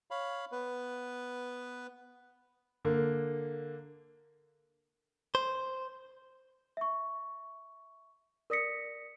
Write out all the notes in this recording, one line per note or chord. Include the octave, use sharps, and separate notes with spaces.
C#5 F5 B5
B3 B4
D3 A#3
C5
E5 C#6
A#4 D5 D#6 A#6 B6 C#7